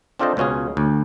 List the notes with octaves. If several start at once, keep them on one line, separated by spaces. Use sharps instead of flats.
C4 D4 F4 A4 C5 D#5
C#2 B2 C#4 F4 G#4
D2